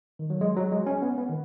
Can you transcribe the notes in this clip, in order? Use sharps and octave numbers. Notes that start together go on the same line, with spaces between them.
D#3
F#3
G#3
F#3
G#3
C#4
B3
B3
D#3